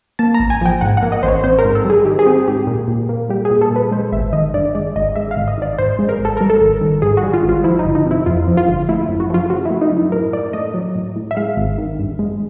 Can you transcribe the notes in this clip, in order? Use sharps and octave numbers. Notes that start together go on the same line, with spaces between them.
A#3 A5
A#5
A1
G#5
F3 G5
G#2 F#5
F#5
A#3
D#5
A1 C5
C#5
C4 C5
A#4
G#2
A4
G3
G#4
D#3 G4
G#4
C4 G4
G#2 G4
A#2
A#2
A#3
G3 G4
G#4
A#2
A4
A#2
B4
G#3 C5
G#1 E5
D#3 D#5
G2 D5
G#3 D5
G#1 D#5
G#3 E5
F5
G#1
D#5
D#3 D5
G#2 C5
G#3
A#4
G#1
A4
G3 A#4
A4
G#1
D#3
G#2 G#4
F#4
G3
F4
G#1
F4
F3 E4
D#4
G1
D#4
C3
E4
F2 F4
F3
F4
G1
A3 E4
F#2
F#4
F3 F4
C#3 F#4
E4
A3
D#4
F#2
E4
A2 A#4
A2 D5
A3 D#5
F#3
A2
A2
E5
G#3 F5
G#1
D#3
G2
G#3